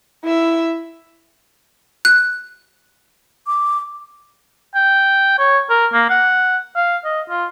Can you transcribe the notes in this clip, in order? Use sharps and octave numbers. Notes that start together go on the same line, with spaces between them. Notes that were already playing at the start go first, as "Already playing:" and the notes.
E4 E5
F#6
D6
G5
C#5
A#4
A#3
F#5
F5
D#5
F4